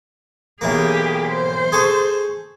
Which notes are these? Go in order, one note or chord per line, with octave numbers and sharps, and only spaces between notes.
B1 E3 A#3 G4 G#4
C5
G#4 A4 C#6